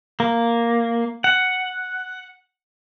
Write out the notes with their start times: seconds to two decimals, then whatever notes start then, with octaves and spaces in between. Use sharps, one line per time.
0.20 A#3
1.24 F#5